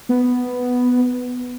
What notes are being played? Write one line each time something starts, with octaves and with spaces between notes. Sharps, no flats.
B3